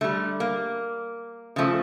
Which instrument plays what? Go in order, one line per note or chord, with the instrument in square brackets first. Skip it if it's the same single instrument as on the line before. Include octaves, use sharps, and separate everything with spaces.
[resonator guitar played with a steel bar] D3 G3 A3
A#3
C#3 F3 A3